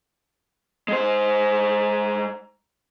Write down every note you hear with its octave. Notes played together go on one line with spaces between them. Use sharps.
G#3 C5